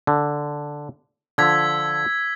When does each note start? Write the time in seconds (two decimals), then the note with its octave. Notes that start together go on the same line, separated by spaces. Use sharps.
0.07 D3
1.38 D3 F3 E6 G#6 B6